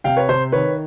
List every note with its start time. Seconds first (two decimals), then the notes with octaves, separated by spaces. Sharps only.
0.04 C3 F5 G5
0.17 B4 C#5
0.29 C3 C5
0.52 D#3 B4 C#5